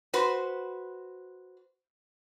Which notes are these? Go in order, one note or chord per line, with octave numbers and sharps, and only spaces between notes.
F#4 B4 C5